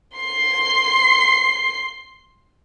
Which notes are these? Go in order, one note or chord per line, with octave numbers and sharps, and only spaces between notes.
C6 C7